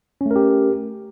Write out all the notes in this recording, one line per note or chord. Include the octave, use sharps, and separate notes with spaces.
A3 C#4 G4 A#4